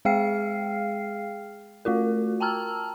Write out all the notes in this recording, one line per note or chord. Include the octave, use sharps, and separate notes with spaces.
G#3 G#4 F5 G5 F6 C7
A3 F4 F#4 A#4
G5 A5 A#5 E6 F6